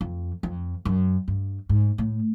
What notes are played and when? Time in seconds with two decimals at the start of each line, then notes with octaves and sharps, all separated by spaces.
0.01 F2
0.43 F2
0.85 F#2
1.28 G2
1.69 G#2
1.98 A2